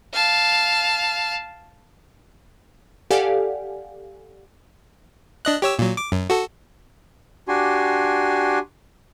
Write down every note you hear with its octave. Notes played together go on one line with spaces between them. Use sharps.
F5 A5
G4 A4 D5 F5 F#5 G#5
D4 D#5 F#6
G4 C#5 E6
A#2 F#3
D6
F#2
F#4 A4
D4 F#4 G4 G#5 C6